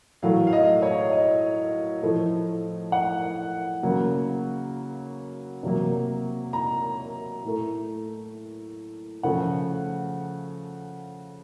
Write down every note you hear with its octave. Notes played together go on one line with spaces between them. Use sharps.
A2 F#3 A3 F5
F5
D#5
C#5
D#5
A2 F3 A3
F#5
C#3 F#3 A#3
C3 F#3 A#3
A#5
A2 A3
C#3 F3 A3 F#5